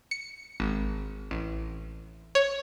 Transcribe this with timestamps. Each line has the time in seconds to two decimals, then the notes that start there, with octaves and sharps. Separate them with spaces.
0.11 C#7
0.60 G#1
1.31 A1
2.35 C#5